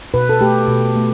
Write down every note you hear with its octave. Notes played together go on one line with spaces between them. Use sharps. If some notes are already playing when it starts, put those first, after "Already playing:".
B2 B4
A4
A3 G4
B2
A3